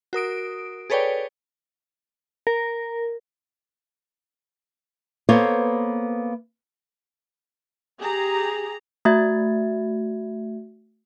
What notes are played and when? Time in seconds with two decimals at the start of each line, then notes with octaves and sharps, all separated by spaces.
0.13 F#4 A#4 D#6 D7
0.90 G#4 A4 B4 C#5 D5 G5
2.47 A#4
5.29 A#3 B3 A4 C5 C#5
7.98 G4 G#4 A#5
9.05 A3 F#4 E5 G#6